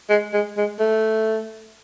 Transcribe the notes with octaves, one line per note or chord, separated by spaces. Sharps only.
G#3
G#3
G#3
A3